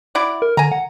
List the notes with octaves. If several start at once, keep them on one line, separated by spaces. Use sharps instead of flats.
E4 F#4 D5
A#4
D3 G#5 A#5
F#5